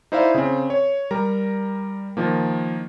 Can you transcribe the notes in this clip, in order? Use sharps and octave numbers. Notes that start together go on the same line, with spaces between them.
D#4 E4 C5 D5 E5 F5
C#3 C4
C#5
G3 A#4 A#5
D#3 F3 A#3